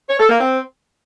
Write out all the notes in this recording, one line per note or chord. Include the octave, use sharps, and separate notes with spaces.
C#5
A4
A#3
C4